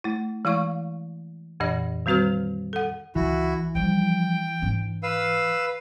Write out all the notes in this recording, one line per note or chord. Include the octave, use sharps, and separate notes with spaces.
A3 E4
E3 G#3 E4 F5 C#6
F2 A#2 E3 D#5 A#6
D#3 G3 C4 F#4 B4 F6
A4 F#5
C#2 E3 E4 F#4
F3 G3 G5
G#2 D4
B4 F5 E6